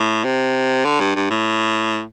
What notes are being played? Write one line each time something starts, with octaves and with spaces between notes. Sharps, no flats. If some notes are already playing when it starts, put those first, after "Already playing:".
Already playing: A2
C3
D3
G2
G2
A2